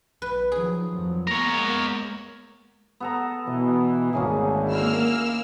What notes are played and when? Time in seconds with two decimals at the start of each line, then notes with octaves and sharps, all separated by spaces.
0.22 B1 B4
0.52 D#3 F3 F#3 G#4
0.93 F2 F3 F#3
1.27 G#3 A#3 B3 A#4 C#5
3.00 B3 A4 A#5
3.47 B2 E3 D#5
4.13 G#1 D2 A#3 C#4 G#4
4.67 A#3 E4 E6 F6